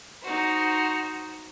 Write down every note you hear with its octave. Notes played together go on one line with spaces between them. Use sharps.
D#4 F#4 C5